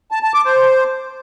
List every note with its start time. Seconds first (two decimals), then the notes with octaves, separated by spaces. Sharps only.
0.11 A5
0.23 A5
0.34 D6
0.45 C5